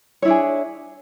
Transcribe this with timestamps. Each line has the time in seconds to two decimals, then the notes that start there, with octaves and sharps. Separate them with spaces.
0.22 C#5
0.25 E4
0.28 D4
0.30 G#4